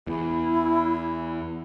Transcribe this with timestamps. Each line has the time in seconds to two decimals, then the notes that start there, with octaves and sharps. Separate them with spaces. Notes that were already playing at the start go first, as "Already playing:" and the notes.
0.07 E2 E4